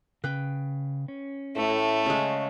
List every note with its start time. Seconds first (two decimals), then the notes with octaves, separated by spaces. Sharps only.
0.24 C#3 B4 G5
1.08 C#4
1.56 A2 A3
2.06 C#3 G#3